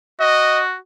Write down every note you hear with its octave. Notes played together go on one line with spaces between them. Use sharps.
F#4 D#5